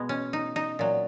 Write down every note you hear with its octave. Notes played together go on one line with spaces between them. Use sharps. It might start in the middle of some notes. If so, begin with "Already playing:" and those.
Already playing: B2 G#3 B3
C#4
D#4
D#4
A#2 F#3